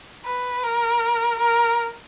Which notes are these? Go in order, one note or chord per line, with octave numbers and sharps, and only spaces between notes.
B4
A#4
A#4